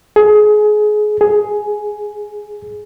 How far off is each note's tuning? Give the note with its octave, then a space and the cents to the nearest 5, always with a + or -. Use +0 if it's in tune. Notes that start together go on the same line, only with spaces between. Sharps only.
G#4 +25
G#4 +10